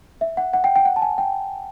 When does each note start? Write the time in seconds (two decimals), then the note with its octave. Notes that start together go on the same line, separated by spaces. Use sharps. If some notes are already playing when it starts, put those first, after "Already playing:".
0.21 E5
0.37 F#5
0.53 F#5
0.64 G5
0.76 G5
0.85 F#5
0.96 A5
1.02 G#5
1.18 G5